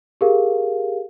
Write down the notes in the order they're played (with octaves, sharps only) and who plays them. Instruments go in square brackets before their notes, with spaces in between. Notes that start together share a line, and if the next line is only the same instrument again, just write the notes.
[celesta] G4 G#4 A#4 F5